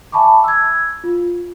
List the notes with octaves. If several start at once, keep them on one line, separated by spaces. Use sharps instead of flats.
E5 G#5 A5 B5 C#6 D6
E6 G#6
F4